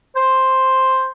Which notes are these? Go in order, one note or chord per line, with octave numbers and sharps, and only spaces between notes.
C5